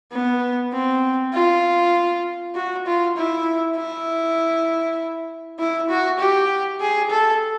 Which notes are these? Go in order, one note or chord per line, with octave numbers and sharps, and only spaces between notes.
B3
C4
F4
F#4
F4
E4
E4
E4
F#4
G4
G#4
A4